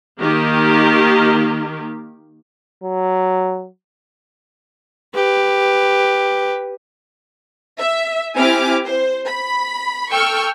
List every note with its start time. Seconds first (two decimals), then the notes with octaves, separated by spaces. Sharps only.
0.19 D#3 A#3 G4
2.84 F#3
5.14 G4 B4
7.78 E5
8.35 C4 E4 G4 G#5 D6 F6
8.84 C5
9.26 B5
10.11 A4 G5 C#6 E6 F6